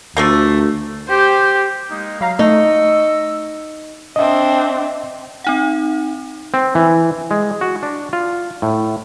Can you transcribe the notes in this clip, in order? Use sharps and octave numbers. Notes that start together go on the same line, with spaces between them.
D2 F3 A3 A#3
G4 C5
G#3 A#3 D#4
F#3 F5 A#5
A3 D#4 D#5 C#6 E6
C4 D4 D#5 E5
C4 D#4 F#5
C4
E3
G#3
F#4
D4
F4
A2